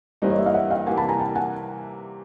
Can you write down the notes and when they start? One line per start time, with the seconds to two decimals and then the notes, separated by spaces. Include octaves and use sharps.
0.22 G2 E3 G3 A#3 D#4 C5 D5
0.30 C#5 D#5
0.38 D5 E5
0.46 D#5 F5
0.54 E5 F#5
0.70 F5 G5
0.86 C3 E3 G3 A#3 F#5 G#5
0.97 A5 B5
1.08 G#5 A#5
1.19 G5 A5
1.35 F#5 G#5